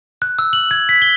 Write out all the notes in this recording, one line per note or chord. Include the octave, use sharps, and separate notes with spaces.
F#6
E6
F#7
G#6
B6
G7